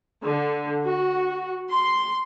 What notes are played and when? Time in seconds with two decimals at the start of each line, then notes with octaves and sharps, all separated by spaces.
0.22 D3
0.83 F#4
1.70 C6